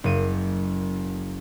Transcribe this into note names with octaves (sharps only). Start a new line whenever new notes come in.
F#1 D#7